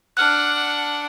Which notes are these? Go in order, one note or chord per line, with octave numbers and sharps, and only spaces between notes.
D4 F#5 F6 F#6